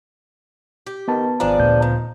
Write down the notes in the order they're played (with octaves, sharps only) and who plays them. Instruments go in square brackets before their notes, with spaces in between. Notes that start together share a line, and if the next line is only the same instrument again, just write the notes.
[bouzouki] G4
[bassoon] D#3 [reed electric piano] B3 B4 A5
[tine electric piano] G#1 A#5 [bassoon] F3 [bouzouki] D4 G#4 D5
[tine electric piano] D2 A#2 G6
[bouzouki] D#3